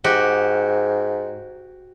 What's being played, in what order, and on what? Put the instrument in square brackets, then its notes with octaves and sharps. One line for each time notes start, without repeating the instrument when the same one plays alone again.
[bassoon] G#2 [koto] F#4 G4